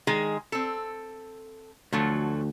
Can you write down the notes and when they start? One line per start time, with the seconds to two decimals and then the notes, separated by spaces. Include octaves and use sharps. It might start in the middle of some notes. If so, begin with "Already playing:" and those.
0.07 D#3 G#3 G#4
0.52 C4 A4
1.93 D2 F3 F#3 A3